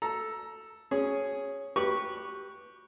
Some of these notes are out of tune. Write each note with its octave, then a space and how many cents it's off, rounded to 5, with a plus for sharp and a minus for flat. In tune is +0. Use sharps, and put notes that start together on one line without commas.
A4 +0 A#5 +15
C#4 +0 G#4 +0
G4 -5 B4 -15 C#6 +0